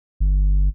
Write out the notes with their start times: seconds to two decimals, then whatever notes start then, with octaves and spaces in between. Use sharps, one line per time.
0.20 G1